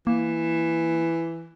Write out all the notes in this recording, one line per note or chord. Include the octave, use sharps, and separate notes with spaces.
E3 A#3